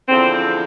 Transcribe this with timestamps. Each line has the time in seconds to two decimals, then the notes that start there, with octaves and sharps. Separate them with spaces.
0.08 E2 D3 F3 C4
0.33 C4